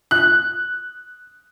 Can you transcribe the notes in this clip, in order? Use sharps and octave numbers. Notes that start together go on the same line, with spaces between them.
F#6